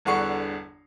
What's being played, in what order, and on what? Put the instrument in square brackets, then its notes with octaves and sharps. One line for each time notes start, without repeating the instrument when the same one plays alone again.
[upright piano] G1 E2 D3 F#5 C#6 C7